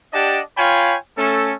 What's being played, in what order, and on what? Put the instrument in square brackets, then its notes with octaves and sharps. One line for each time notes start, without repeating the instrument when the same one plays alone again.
[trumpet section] D4 G4 D5 D#5 F#5 A5
F4 C#5 F5 G5 G#5 B5
A3 C#4 A4